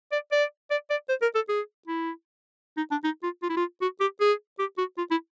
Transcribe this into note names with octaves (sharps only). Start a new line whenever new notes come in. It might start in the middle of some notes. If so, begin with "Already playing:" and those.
D5
D5
D5
D5
C5
A#4
A4
G#4
E4
D#4
D4
D#4
F4
F4
E4
F4
F#4
G4
G#4
G4
F#4
F4
E4